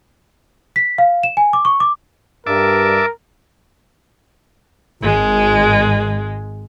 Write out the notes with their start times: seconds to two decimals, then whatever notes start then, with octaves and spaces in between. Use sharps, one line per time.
0.76 B6
0.98 F5
1.23 E7
1.37 G#5
1.53 D6
1.65 C#6
1.80 D6
2.47 G2 A#4 E5 A5 D6
5.03 G#1 G#3